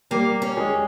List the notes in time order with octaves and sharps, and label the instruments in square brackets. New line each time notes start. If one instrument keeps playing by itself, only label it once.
[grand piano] G3 G4 [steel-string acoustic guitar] A#3
[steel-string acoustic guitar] C#4
[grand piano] G#3 G#4